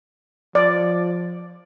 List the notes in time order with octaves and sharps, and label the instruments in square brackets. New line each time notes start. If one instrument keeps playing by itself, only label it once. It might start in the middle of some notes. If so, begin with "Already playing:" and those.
[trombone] F3 [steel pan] D5